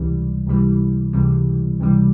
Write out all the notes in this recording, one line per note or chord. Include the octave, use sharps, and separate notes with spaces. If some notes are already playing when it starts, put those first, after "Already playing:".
Already playing: C#2 C3 E3 G3
C#2 C3 E3 G3
C#2 C3 E3 G3
C#2 C3 E3 G3